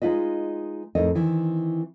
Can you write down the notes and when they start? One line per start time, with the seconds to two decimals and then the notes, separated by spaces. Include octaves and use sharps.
0.02 G#3 D#4 F4 B4 D#5
0.95 F2 A2 D#4 A#4 D#5
1.15 D#3 E3 C4